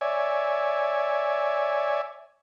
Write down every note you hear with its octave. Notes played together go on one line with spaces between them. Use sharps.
C#5 D5 E5 G#5